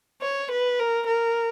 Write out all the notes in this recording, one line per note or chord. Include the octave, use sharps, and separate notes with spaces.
C#5
B4
A#4
A#4